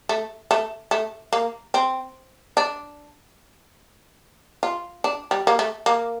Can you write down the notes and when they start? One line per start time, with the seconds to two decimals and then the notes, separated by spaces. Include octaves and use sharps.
0.09 A3
0.51 A3
0.91 A3
1.33 A#3
1.74 C4
2.57 D4
4.63 F4
5.04 D4
5.31 G3
5.47 A#3
5.59 A3
5.86 A#3